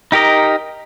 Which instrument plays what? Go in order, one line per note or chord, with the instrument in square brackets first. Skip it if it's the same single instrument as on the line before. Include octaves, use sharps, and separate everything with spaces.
[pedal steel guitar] D#4 G4 A#4 D#5